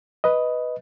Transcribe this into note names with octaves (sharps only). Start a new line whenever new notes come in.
B4 D#5